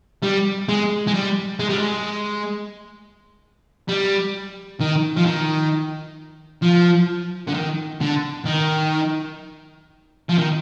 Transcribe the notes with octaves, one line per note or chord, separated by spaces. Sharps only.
G3
G#3
G#3
G3
G#3
G3
G#3
G3
D#3
F3
D#3
F3
D3
D#3
D3
D#3
F3
D#3